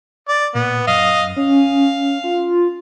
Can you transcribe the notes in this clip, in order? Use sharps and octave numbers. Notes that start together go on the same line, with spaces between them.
D5
A#2 B3
F#2 D#5 F5
C#4 F5
F4